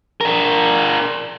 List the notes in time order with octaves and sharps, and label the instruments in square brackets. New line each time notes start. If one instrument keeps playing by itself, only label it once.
[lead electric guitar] D4 A#4